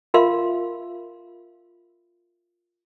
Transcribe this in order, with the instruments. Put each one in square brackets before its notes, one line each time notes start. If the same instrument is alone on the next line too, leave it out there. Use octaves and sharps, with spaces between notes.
[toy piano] F4 A#4 E5 F5 C6